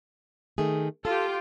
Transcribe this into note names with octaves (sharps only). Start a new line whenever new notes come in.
D#3 A3 G#4
F4 G4 A4 G5